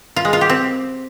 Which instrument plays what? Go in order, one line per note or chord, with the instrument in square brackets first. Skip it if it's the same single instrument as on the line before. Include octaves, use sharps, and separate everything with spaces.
[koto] F4
G#3
F4
G4
C4